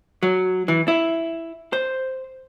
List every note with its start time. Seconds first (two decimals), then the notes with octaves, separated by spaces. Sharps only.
0.23 F#3
0.68 E3
0.88 E4
1.73 C5